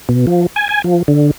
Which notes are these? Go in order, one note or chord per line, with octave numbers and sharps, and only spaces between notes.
B2
F3
G#5
G#5
F3
D3